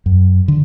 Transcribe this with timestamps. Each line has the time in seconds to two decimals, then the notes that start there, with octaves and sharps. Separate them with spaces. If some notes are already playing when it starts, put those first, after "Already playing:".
0.06 F#2
0.48 D3